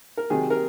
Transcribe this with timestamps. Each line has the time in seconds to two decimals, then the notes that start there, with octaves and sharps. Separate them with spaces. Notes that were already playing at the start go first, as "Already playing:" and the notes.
0.17 A#4
0.30 C3 D#3 F#3 G#4
0.50 A#4